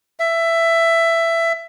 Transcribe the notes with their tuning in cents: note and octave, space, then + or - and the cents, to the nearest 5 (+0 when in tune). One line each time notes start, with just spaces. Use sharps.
E5 +15